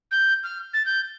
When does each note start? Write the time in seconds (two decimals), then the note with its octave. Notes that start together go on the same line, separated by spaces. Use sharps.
0.11 G6
0.43 F6
0.73 A6
0.85 G6